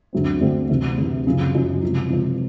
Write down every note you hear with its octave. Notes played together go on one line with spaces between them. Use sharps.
D2 D3 F#3 A3 C4
D2 D3 F#3 A3 C4
D2 C3 E3
D2 C3 E3
F#2 C#3 F3
F#2 C#3 F3
C#2 C3 F3
C#2 C3 F3